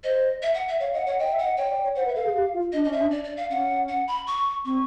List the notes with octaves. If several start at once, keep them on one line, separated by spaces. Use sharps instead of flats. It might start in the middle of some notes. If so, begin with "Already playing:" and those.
C5 D#5
E5
F#5
E5
C#5 F5
D#5 F#5
C#5 F#5
D#5 G5
E5
F#5
D#5
C#5 G5
D5
C#5
C5 F#5
B4
E5
A4 F5
G#4
G4
F4
D4 D#5
C#4 D#5
E5
D4
D5
D5
F5
C#4 F#5
F#5
B5
C#6
C4 C#6